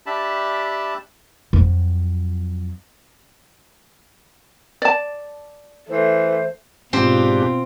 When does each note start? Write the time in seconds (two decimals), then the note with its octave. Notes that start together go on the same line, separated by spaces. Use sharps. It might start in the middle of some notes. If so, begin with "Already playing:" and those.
0.06 D4 G4 E5 A5 B5
1.53 F2 F#3
4.82 D5 A5
5.89 E3 A3 C5
6.93 G#2 B2 C4 D4 F4 G4